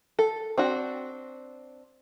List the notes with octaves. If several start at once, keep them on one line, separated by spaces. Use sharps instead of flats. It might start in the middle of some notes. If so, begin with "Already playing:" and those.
A4
C4 D4 F#4